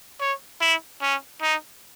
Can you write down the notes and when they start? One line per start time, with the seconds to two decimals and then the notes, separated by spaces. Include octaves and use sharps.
0.21 C#5
0.61 E4
1.02 C#4
1.42 D#4